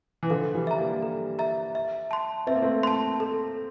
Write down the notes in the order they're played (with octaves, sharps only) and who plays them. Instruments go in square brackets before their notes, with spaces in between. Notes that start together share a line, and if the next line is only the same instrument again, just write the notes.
[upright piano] E3
[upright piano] D3 F3 [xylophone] A4
[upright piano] E3 G3
[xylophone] E5 A#5
[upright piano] G3 A#3
[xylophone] A4
E5 A#5
E5
A5 C6
[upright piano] C4 [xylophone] E5
[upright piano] A#3
A3 C4
[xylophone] A5 C6
A4